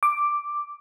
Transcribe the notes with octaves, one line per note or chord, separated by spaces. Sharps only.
D6